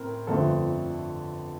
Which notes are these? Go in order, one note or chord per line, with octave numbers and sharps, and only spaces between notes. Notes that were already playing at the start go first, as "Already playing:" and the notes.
Already playing: A2 C4 A#4
G1 F2 D3 A3 C4 A4